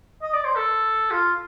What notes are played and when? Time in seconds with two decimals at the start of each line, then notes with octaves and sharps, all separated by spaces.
0.22 D#5
0.34 D5
0.45 C5
0.56 A4
1.11 F4